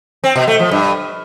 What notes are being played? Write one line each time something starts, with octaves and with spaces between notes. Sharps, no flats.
C4
B2
A3
F3
G2